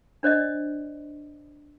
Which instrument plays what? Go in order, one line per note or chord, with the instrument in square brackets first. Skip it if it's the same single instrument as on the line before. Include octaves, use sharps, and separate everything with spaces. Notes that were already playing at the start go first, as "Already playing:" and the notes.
[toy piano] D4 C5 D5 D#5